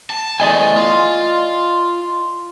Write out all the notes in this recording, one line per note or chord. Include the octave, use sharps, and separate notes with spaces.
A5
E2 A3 D5 D#5 G#5
F4